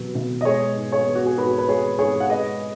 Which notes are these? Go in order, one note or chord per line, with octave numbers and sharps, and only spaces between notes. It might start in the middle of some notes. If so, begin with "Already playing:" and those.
Already playing: B2 F#3 B3
B2
D#5
G#3 G#4 C#5
G#2
G#4 C#5
B3
F#4
G#4
G#2 F#4 B4
B4
G#3 G#4 C#5
G#2 G#4 C#5
F#5
G#3 B4 D#5